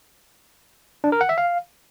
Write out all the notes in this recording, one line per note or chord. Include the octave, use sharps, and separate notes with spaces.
D4
A#4
F#5
E5
F5